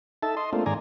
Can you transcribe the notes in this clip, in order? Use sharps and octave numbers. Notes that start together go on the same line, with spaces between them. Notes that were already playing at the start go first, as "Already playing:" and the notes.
D#4 A4 E5 A5
D#5 C6
A3 A#3 C4 D4 F4
G#2 D#3 D5 G#5 A#5